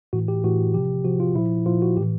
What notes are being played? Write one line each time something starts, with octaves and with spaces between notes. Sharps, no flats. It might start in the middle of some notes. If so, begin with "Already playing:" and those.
A2 E3 F#4
G4
A2 E3 F#4
C3 F3 G4
C3 F3 F#4
F4
A#2 F3 E4
A#2 F3 F4
F#4
A2 E3 G4